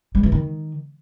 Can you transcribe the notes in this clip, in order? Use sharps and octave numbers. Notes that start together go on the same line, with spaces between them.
G3
E3
D#3